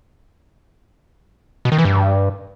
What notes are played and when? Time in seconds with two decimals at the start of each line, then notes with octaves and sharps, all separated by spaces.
1.65 B2
1.72 D#3
1.78 E3
1.85 G2